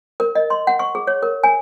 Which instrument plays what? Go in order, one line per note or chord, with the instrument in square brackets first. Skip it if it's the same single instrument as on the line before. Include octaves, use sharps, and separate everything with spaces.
[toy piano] A#4
D#5
C6
F#5
C#6
G#4
C#5
A#4
G#5